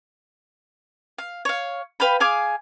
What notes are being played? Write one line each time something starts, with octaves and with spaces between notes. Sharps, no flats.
F5
C#5 F5
B4 F5 G5 B5
G#4 F5 G#5 D6